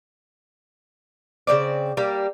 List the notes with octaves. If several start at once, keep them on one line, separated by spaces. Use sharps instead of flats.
C#3 F#3 C4 D5
G3 A#3